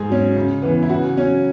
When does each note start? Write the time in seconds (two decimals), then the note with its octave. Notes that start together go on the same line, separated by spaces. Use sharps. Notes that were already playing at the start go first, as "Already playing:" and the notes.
Already playing: G#2 G#4
0.09 F#3 C#4
0.36 C#3
0.62 E3 B3
0.82 E4
0.89 C#3 F#4
1.16 F#3 C#4